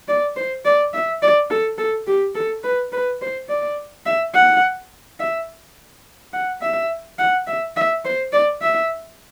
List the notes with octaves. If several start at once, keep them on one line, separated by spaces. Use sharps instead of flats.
D5
C5
D5
E5
D5
A4
A4
G4
A4
B4
B4
C5
D5
E5
F#5
E5
F#5
E5
F#5
E5
E5
C5
D5
E5